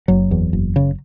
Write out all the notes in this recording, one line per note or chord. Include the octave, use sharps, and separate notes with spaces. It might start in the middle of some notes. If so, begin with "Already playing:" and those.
F#1 F#3
E2
F#1
C#3